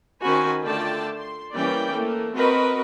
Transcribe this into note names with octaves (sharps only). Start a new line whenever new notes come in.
D#3 C#4 F#4 C5 G#5 B5
D3 A3 F4 D5 G5 A5
C6
E3 G3 A#3 C#4 D5 G5
A3 A#3
C4 F#4 A#4 B4 D#5